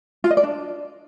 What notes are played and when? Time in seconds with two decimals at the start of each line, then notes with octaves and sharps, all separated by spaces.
0.24 F4
0.31 D#5
0.37 D5
0.44 D4